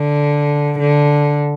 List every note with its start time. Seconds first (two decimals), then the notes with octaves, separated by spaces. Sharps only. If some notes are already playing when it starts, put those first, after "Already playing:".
Already playing: D3
0.79 D3